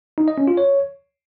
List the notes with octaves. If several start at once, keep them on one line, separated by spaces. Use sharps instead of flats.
D#4
D#5
C#4
F4
C#5